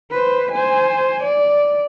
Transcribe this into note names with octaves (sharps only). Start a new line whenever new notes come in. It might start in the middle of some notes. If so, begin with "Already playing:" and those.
B4 C5
C5 G#5
D5